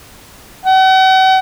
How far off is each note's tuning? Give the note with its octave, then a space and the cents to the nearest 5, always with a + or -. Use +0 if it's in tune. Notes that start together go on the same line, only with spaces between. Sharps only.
F#5 +40